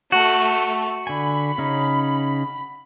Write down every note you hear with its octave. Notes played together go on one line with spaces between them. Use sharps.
A3 F#4
D3 G#5 B5
C#3 C#4 D#4